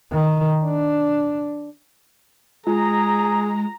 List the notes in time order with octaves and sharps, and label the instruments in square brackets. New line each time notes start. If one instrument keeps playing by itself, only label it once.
[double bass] D#3
D4
[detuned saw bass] G#3 [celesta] F4 [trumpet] G#4 [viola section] A#5